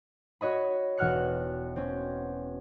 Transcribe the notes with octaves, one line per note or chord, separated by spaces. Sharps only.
F#4 C#5 D#5 B5
E1 F#4 F#5 F6 F#6 C#7
C4 C#4